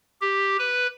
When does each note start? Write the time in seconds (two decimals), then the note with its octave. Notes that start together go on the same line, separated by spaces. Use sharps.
0.21 G4
0.58 B4